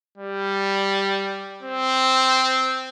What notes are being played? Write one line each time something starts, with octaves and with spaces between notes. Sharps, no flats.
G3
C4